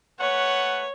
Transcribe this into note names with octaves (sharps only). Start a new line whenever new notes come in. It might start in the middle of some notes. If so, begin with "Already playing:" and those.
A3 B4 C#5 F#5